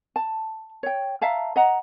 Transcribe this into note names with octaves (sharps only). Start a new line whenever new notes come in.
A5
C#5 G5
E5 F5 A5 A#5
D#5 F#5 A#5